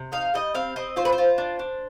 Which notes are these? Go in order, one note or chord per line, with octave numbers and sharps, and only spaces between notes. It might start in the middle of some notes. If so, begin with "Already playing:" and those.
Already playing: C3
D#4 F5
G3 D#5
C4 F5
C4 D#5
F4 C5
B4
C5
F4
D4
D4